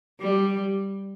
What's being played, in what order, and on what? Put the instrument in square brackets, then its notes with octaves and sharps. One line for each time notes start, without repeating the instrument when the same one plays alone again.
[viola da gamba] G3